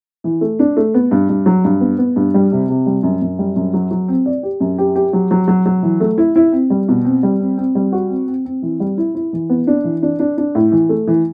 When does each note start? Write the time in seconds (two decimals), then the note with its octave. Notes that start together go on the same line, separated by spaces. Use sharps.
0.24 E3
0.41 A3
0.59 D4
0.77 A3
0.94 B3
1.11 G2
1.29 G2
1.46 F#3
1.64 G2
1.81 B3
1.98 B3
2.16 G2
2.34 G3
2.52 C3
2.69 C3
2.86 G3
3.03 F#2
3.22 F#2
3.39 G3
3.56 F#2
3.74 F#3
3.91 F#3
4.08 C4
4.26 D5
4.43 G4
4.60 F#2
4.78 G4
4.96 G4
5.13 F#3
5.31 F#3
5.48 F#3
5.66 F#3
5.83 E3
6.00 A3
6.18 E4
6.36 E4
6.52 C4
6.70 G3
6.88 B2
7.05 C4
7.23 G3
7.40 C4
7.58 C4
7.75 G3
7.92 F#4
8.10 C4
8.27 C4
8.45 C4
8.62 E3
8.80 G3
8.98 E4
9.15 E4
9.33 E3
9.50 B3
9.67 D4
9.84 E3
10.03 D4
10.19 D4
10.38 D4
10.55 A2
10.72 E3
10.89 A3
11.07 E3